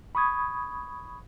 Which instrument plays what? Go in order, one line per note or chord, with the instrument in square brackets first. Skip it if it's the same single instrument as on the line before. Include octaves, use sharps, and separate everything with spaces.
[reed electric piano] B5 C#6 D#6 G#6